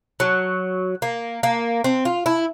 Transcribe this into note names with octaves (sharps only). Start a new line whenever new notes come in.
F#3
A#3
A#3
C4
F4
E4